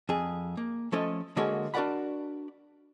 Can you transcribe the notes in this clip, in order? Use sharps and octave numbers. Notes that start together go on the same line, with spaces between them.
F2 G#4
A#3
F3 A3 C#4 A4 C#5 D#5
D3 G#3 A#3 F#4 A4 C#5
D4 F#4 A#4 D5 F#5 B5